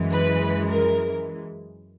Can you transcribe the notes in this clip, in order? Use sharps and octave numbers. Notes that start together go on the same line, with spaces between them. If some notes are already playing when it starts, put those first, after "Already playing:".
Already playing: F#2 E3 G#3
B4
A#4